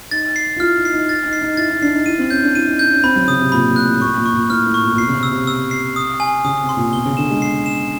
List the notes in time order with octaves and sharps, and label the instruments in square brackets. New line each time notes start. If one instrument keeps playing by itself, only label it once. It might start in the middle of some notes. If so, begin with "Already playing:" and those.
[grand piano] D#4 [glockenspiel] A6
[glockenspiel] C7
[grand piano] F4
[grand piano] E4 [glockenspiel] F6
[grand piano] D#4
[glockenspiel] C7
[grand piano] D#4
[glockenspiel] A6
[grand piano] D#4
[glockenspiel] C7
[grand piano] D#4
[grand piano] E4 [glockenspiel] A6
[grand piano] D#4
[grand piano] D4 [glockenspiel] C7
[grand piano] D#4
[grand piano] E4 [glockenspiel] D#7
[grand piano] C4
[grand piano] C#4 [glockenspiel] G6
[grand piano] D4
[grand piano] E4 [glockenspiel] D#7
[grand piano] D#4
[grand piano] D4 [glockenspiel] G6
[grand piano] C#4
[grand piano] C4 [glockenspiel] B5
[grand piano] F#3
[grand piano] C#3 [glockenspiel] D#6
[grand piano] C3
[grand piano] A#2 [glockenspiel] B5
[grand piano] A#2
[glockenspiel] F#6
[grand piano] A2
[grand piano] A#2 [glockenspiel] C#6
[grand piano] A#2
[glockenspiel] C#6
[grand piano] A#2
[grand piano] A2 [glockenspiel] F6
[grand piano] A2
[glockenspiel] C#6
[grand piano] A#2
A#2
[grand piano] B2 [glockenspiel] C7
[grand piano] C#3
C3
[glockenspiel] E6
[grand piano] C3
[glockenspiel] E6
C7
D#6
G#5
[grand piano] C#3 [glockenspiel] D#6
[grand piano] C3
[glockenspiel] C6
[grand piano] A#2
[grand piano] B2 [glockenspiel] G7
[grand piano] C#3
[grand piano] D3 [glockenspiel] E7
[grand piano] G#3
[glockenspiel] C7
E7